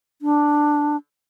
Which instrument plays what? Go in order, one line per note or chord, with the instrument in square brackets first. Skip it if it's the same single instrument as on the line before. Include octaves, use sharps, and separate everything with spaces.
[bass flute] D4